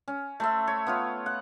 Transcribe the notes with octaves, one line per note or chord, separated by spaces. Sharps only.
C#4
A3 C5 E5
C#5
B3 F4 C#5
F#5